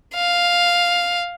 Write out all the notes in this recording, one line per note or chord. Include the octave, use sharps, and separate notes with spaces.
F5